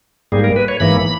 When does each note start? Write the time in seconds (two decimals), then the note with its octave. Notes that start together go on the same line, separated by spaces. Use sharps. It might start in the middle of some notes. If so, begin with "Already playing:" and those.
0.32 G#2 G3 A#3 G#4
0.44 A#4
0.56 B4
0.68 C#5
0.80 G#2 E3 A#3 B5